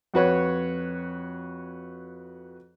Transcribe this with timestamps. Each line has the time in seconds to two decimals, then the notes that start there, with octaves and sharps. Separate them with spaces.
0.14 F2 F#4 B4 C#5